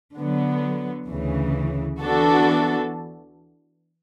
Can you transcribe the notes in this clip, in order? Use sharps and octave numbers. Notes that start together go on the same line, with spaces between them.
D3 F#3 B3
D2 C#3 E3
E3 B3 D4 F#4 A4